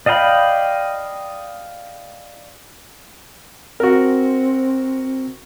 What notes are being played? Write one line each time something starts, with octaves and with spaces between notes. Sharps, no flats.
D5 D#5 F5 G5 B5
C4 F#4 A#4